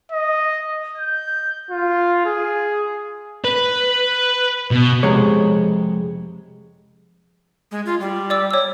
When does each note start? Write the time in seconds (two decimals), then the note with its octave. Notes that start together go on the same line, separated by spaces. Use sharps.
0.12 D#5
0.98 G6
1.71 F4
2.26 G#4
3.44 B4
4.71 B2
5.03 F2 C3 G#3 C#5
7.71 G#3
7.86 F4
8.00 G3
8.30 D5 D6 E6
8.51 C#5 E6